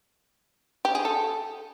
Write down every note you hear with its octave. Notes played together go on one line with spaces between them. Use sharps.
G4
G#4
A4